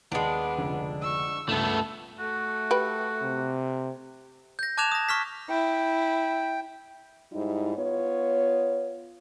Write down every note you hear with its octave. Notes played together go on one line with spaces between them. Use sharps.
D#2 G#3 B3 D4
F1 C#2 D3
C#6 E6
C#2 G2 A3 B3 A4
A3 F#4
G4 B4
C3
G6 A#6
A5 D6 F#6 G#6 E7 F7
D#6 A#6
C#6 F6 B6
E4 G5
G#2 G3 D#4 E4
B3 F4 C#5